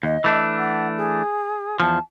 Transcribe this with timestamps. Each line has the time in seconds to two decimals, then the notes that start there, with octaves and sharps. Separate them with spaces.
0.03 D#2 D#5
0.24 E3 A3 D4
0.57 F#5
0.97 G#4
1.80 E2 F3 A5